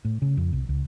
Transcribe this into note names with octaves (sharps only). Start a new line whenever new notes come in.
A2
C#3
F2
C2
C#2